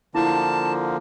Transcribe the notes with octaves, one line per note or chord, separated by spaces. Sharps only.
D3 F3 A#3 E4 A5